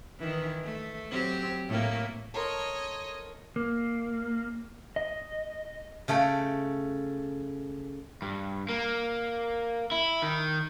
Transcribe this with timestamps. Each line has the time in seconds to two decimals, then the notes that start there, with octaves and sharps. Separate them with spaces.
0.19 D#3 E3
0.64 A3
1.11 F#3 C4 G4
1.69 A2 A3 A#3
2.34 A4 A#4 C#5 D#5 C6
3.56 A#3
4.96 D#5
6.08 C#3 A3 A4 G5
8.22 G2
8.69 A#3
9.92 E4
10.22 D#3